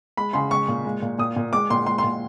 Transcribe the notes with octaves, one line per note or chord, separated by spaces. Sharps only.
G#3 B5
C#3 C6
G#3 C#6
A#2
G#3
A#2
A#2 D#6
A#2
G#3 D6
A#2 C6
G#3 C6
C6
A#2